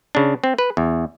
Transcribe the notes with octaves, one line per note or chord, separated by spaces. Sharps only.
C#3 D4
C4
B4
E2